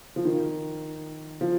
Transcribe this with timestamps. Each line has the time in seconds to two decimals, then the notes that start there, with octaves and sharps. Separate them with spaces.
0.16 F3
0.25 D#3
1.41 F3